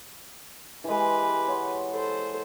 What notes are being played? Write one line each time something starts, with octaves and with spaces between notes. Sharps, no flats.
E3 G#3 G4 B4
C#5 F#5 C6
A4 C5